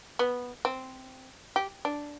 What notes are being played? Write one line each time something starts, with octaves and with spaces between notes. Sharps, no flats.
B3
C4
G4
D4